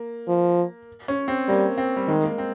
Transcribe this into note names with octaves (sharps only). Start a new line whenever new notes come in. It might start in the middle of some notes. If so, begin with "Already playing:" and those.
Already playing: A#3
F3
C#4
C4
G3 A#3
C4
G3
D#3 G#3
A#3
C4